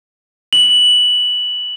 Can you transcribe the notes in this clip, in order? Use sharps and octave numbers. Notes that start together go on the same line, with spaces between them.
F#7